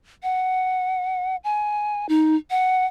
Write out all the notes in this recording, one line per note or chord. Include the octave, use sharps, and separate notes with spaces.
F#5
G#5
D#4
F#5